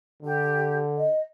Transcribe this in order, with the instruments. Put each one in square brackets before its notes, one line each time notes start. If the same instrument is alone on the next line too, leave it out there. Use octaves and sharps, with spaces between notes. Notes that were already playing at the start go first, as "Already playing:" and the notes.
[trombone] D3 [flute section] G4
[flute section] D#5